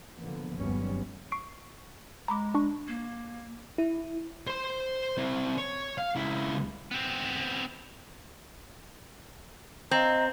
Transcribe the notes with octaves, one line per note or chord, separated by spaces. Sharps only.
D3 E3 F3 A#3 B3
G1 D#2 F#3 G3 B3 C#4
C#6 C7 D7
G#3 A#5 B5 D6
D4 C#6
A#3
E4
C5 C6
C4 E4
C#5
F5
C#2 E4
B3 C4
C4 D#5 F5 A#5